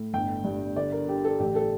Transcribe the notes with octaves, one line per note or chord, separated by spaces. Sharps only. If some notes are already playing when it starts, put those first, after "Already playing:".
Already playing: A2
G1 G5
G2
D3 D5
A#4
D3 G4
A4
A1 G4
A4